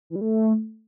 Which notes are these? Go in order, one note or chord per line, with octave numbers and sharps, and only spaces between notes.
E3
G3
A3